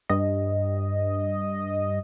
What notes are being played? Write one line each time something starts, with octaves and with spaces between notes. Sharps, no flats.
G2 D#5